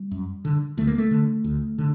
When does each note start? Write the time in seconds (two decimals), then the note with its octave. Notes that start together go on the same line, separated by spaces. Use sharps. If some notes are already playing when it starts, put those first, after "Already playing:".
Already playing: G3
0.11 F#2
0.45 D3
0.78 D2 A3
0.87 A#3
0.98 A3
1.11 D3
1.44 D2
1.78 D3